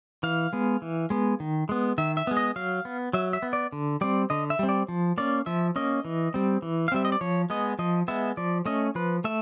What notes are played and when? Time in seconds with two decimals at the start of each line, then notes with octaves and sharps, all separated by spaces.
0.23 E3 F5
0.53 G#3 B3
0.82 E3
1.10 G#3 B3
1.40 D#3
1.69 G#3 B3
1.98 D#3 E5
2.17 E5
2.27 G#3 B3
2.37 D#5
2.56 F#3 F5
2.85 B3
3.13 F#3 E5
3.33 E5
3.43 B3
3.53 D5
3.72 D3
4.01 G3 C4 D5
4.30 D3 D#5
4.50 E5
4.59 G3 C4
4.69 D5
4.88 F3
5.18 A#3 C#4 D5
5.46 F3 E5
5.76 A#3 C#4 D#5
6.05 E3
6.34 G3 C4
6.62 E3
6.88 F5
6.92 G3 C4 E5
7.05 D#5
7.12 D5
7.21 F3 C#5
7.50 G#3 B3 D#5
7.79 F3 D#5
8.08 G#3 B3 E5
8.37 F3 D5
8.66 A3 C#4 D#5
8.95 F3 B4
9.24 A3 E5